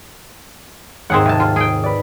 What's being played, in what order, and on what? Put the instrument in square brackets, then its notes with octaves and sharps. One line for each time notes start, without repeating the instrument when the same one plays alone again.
[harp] D#2 G#2 [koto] C4 G#4 F#5
[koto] C3 A5 [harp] G#5
[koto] F4
G#4 G5
[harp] B4 D5